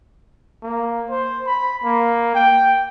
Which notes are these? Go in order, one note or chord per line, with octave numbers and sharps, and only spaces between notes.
A#3
C5
B5
A#3
G5